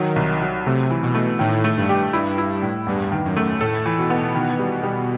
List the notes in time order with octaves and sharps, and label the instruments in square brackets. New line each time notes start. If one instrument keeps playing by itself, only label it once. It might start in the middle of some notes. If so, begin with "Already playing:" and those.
Already playing: [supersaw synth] D#3 [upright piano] F#3
[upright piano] C2
F#3
[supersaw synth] C3 [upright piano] A3
[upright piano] E3
[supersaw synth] B2
[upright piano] A3
[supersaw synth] A2 [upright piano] D#3
[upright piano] A3
[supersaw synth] G2
[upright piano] G4
[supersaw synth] G2 [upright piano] E4
[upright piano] E4
A2
[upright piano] E2 [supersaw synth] G2
[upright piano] D#3
[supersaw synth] F#2
[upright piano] A3
[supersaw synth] A2 [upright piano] A4
[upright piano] E3
[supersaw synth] B2
[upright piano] B3
D#3
G3
G3